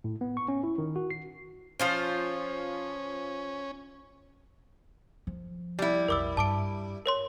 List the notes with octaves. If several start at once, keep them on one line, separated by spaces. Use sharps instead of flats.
A2
B3
C#6
C#4
E4
D#3
F#4
C7
F3 C#4 F4 C5
F3
G3 E4
B1 F2 A#4 D6 E6
G2 A5 D6 D7
A#4 C#5 C6